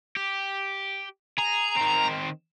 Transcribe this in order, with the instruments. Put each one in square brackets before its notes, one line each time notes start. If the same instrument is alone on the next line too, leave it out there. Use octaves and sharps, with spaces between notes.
[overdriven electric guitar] G4
[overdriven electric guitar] G#4 [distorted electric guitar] A#5
[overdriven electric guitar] D#3 C4